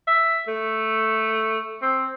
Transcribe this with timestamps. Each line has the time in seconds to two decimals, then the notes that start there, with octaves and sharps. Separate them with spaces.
0.08 E5
0.48 A3
1.82 C4